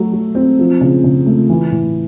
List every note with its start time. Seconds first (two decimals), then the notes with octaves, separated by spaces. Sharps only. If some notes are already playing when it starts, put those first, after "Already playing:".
Already playing: F#3 A3
0.12 F#3
0.35 C4
0.59 F3
0.81 C#3
1.04 C#3
1.26 A3
1.49 E3
1.72 A2